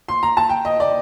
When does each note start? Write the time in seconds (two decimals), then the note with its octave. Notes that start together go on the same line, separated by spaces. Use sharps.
0.08 C6
0.23 A#5
0.37 A5
0.49 G5
0.65 D#5
0.80 D5